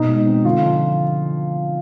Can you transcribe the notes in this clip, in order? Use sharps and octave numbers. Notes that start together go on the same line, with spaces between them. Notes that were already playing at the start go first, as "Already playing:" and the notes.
Already playing: B2 D#4
G#3
C4
D3 F4
F3